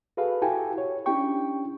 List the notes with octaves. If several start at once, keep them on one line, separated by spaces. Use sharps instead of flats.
F#4 G#4 A4 B4 F5
E4 F#4 G4 A4 G5 G#5
C#5
C#4 D4 E4 G4 G5 C#6